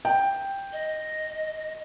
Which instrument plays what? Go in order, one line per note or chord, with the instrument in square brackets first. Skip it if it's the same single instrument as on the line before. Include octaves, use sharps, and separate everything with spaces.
[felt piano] G5
[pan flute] D#5